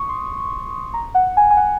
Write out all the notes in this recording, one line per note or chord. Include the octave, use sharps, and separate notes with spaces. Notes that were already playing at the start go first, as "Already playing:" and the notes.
Already playing: C#6 D#6
C6
A#5
F#5
G#5
G#5
F#5